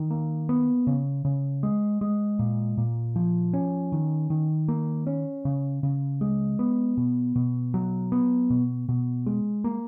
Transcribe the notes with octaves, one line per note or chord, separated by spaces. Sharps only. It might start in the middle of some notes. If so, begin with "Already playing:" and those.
Already playing: D#3
A#3
B3
C#3
C#3
G#3
G#3
A#2
A#2
F3
C#4
D#3
D#3
A#3
C#4
C#3
C#3
G#3
B3
B2
B2
F#3
B3
B2
B2
G#3
A#3